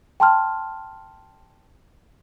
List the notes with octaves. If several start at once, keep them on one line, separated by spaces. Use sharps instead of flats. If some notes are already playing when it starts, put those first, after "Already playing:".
G5 A5 C6 F6